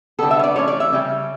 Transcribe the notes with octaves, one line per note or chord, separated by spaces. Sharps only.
D3 G3 B3 A4
E5
C#5
D5
E3 A3 C#4 C#5
D5
E5
C#3 G3 C#4